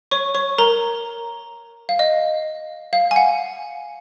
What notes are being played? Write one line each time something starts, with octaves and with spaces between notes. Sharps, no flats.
C#5 C#6
C#5 C#6
A#4 A#5
F5
D#5
F5
G#5
F#5